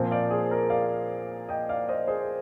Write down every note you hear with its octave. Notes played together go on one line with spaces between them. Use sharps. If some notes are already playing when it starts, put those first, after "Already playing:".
Already playing: A#2 F3 C4
D5 F5
G#4
A#4
D5 F5
D#5 G5
D5 F5
C5 D#5
G#4 C5